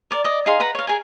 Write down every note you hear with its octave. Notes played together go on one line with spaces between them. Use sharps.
A#4 D5
D5 D#5
D#4 G#4 F5 C6
B4 F#5 A#5 B5
C#5 F5
G#4 A#4 G#5